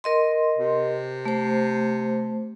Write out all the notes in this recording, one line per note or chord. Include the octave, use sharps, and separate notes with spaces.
A#4 D#5 C6
C3
A3 C5